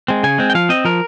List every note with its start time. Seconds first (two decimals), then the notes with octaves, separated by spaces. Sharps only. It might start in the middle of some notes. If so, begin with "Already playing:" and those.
0.08 G#3 C4
0.23 C#3 G#5
0.38 G#3 C4
0.50 G5
0.54 F3 F5
0.69 C4 D#5
0.85 F3 A#4